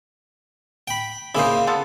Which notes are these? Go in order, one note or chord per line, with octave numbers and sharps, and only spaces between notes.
G5 B5
C#3 A#3 D#4 E4 C5
B3 F4 A4